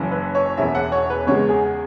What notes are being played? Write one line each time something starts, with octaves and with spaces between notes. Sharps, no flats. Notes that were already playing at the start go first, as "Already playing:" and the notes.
Already playing: F#1 F#2 E3
B4
C#5
E1 E2 E3 C#4 E5
F#5
C#5
B4
E2 C#3 G#3 C#5
G#4